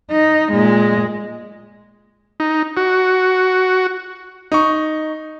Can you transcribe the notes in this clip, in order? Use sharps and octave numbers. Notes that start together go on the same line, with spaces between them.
D#4
A#2 G#3
D#4
F#4
D#4 C#6